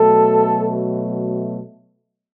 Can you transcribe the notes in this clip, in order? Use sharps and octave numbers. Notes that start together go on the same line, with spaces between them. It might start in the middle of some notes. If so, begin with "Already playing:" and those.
Already playing: B2 F#3 A3 A4